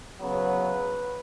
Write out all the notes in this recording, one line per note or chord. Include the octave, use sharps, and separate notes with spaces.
C#3 F#3 B3 B4